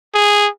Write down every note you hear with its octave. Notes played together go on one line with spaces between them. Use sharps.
G#4